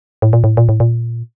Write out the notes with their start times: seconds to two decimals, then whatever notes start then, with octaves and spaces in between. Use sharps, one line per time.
0.22 A2
0.33 A#2
0.44 A2
0.57 A#2
0.69 A2
0.80 A#2